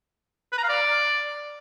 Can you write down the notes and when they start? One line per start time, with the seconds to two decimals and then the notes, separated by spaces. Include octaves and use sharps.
0.52 B4
0.58 A#5
0.63 F5
0.69 D5